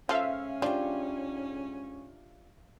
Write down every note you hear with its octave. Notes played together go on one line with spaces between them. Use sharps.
G#2 F3 C#4 A4 E5 F5
F3 D4 F4 G4 C#5 D5